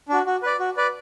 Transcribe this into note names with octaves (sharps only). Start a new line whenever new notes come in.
D4 F#4
F#4
B4 D5
F#4
B4 D5